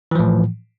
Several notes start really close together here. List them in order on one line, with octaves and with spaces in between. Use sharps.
E3 F3 A2